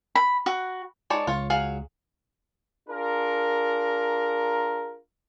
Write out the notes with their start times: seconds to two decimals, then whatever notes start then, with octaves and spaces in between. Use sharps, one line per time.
0.15 B5
0.46 F#4
1.10 G#3 D#4 C#5 D5 A5
1.27 C#2 F4 C#5
1.50 F#3 G#4 F5
2.89 D4 F4 G#4 A#4